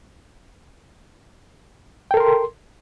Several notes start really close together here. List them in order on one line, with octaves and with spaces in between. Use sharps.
G5 A4 A#4 C6